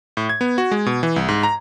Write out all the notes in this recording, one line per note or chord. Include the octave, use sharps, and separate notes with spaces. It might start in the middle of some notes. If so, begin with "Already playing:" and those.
A2
G#6
B3
F#4
G#3
B2
E3
C2
G#2
A#5